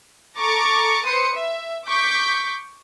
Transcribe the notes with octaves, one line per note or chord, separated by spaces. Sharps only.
A4 A#5 C#6 D6 A6 C#7
B4 C5 C6 D#6 C#7
E5
C#6 D6 G6 B6